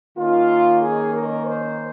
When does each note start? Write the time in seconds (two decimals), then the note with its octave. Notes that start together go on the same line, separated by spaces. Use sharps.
0.16 D#3 A#3 C#4 F4
0.82 G#4
1.13 A#4
1.45 C5